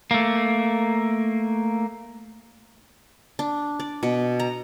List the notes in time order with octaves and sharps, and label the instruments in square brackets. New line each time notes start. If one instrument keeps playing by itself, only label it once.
[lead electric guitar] A3 A#3
[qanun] D4
D5
B2
A#5